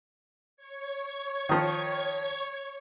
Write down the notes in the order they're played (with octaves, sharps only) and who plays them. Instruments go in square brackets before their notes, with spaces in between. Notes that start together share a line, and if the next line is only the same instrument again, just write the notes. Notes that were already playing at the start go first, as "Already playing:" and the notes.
[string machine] C#5 C#6 G#6
[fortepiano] D#3 F3